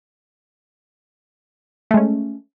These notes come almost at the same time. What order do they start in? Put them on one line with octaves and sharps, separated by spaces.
A3 G#3 C#4